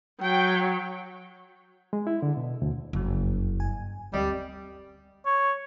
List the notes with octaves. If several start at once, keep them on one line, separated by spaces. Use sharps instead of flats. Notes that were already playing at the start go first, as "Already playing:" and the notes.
F#3 G5
G#3
E4
D3
B2
D2
F#1 F2 C#3 F#3
G2 G#5
D2 G3 C4 D#5
C#5